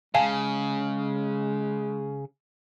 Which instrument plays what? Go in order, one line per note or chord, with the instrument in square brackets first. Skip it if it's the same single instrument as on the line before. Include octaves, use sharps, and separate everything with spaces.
[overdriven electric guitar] C#3 [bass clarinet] G#3 [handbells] F5 G#5 A5